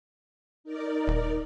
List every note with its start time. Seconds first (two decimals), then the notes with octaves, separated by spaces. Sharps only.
0.64 D#4 A#4 D5
1.08 D#1